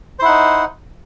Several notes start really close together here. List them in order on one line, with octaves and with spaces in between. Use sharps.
C5 E4 F#5 D#4